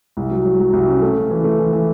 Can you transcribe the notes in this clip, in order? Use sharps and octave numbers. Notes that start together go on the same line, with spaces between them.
C2
F#3
F#3
F#3
C2
C#4
A3
C#3
E3
A3
E3
E3